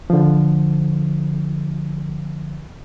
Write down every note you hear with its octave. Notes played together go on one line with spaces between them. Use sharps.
D3 F3